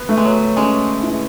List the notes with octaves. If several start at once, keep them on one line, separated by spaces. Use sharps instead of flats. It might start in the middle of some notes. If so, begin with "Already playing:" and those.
Already playing: B3 B4
A3
G#3
F#3
G#3 C#4
E4